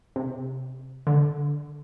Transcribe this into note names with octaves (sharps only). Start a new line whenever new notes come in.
C3
D3